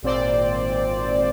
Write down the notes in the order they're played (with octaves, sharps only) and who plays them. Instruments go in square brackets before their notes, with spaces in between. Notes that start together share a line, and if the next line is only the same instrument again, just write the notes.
[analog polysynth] G#1 A#2 C4 C5 D5